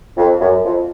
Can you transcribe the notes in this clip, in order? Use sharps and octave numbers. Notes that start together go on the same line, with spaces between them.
F2
F#2
F2